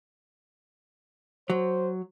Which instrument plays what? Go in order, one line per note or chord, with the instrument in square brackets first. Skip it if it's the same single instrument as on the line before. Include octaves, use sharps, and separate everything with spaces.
[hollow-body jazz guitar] F#3 [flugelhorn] C5